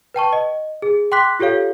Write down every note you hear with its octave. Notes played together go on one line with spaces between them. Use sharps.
B4 G5 A5 C#6
D#5
G#4
G5 C6 D6 F#6 B6
F4 G4 A4 C#5 F5